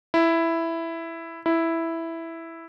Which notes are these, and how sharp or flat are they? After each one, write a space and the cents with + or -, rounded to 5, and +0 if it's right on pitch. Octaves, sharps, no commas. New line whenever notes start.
E4 +5
E4 +0